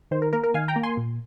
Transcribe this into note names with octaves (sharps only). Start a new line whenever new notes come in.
D#3 C5
A#4
A#3 A#4
A#4
D#3 F5 G#5
G5 A#5
A#3
G#5 C6
A#2